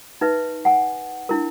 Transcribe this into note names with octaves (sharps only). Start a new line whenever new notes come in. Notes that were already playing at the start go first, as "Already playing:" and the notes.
D#4 B4 E5
F#5 G#5
D4 E4 A#4